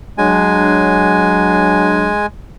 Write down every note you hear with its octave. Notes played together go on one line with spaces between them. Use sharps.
F#3 G#3 D4 G#5